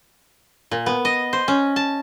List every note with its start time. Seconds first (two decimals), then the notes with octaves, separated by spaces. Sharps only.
0.71 A#2
0.86 B3
1.05 D#5
1.33 C5
1.48 C#4
1.76 A5